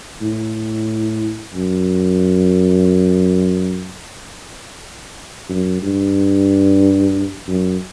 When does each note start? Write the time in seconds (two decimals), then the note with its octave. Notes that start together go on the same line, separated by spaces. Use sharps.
0.22 A2
1.54 F#2
5.49 F#2
5.82 G2
7.48 F#2